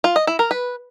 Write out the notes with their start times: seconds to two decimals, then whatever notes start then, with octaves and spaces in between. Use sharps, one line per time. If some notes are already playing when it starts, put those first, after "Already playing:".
0.04 F4
0.16 D#5
0.27 E4
0.39 A#4
0.51 B4